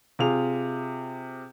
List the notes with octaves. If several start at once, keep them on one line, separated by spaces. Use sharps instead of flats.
C3 F4 G#4 F7